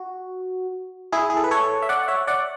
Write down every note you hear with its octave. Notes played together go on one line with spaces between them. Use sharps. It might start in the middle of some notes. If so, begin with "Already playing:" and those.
Already playing: F#4
E4 G#4
G#4
A4
B4
A4 C#5
E5
D5 F#5
F#5
C#5 E5
D5 F#5